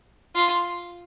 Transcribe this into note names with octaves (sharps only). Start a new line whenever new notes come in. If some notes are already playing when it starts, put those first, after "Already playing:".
F4